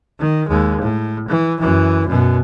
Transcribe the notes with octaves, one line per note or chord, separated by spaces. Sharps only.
D#3
D#2 G#3
A2
E3
F#2 E3
F#2 B2